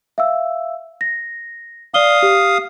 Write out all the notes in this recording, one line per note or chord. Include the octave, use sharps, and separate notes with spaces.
E5 F5 E6
A#6
D5 F5 D#6 G7
G4